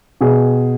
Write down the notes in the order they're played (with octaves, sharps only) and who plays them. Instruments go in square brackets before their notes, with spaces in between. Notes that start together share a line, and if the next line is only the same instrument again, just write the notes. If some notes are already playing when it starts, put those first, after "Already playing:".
[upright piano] B2 G#4